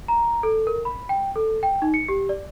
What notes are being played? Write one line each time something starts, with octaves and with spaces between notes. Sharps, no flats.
A#5
A4
A#4
B5
G5
A4
G5
D#4
C#7
G4
D5